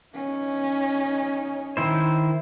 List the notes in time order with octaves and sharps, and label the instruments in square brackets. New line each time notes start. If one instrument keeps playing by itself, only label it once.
[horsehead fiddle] C#4 D#4
[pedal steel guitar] D#3 E4 C5